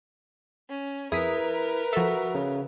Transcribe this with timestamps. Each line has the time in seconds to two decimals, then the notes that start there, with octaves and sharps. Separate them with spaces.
0.69 C#4
1.12 F2 E4 G#4 A#4 B4 D#6 B6
1.93 F3 F#4 A4 E5
2.35 C#3